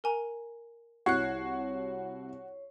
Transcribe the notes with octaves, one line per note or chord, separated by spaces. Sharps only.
A#4 G#5 A#5
C2 E4 F#4 C#5 F#5 F#6 C7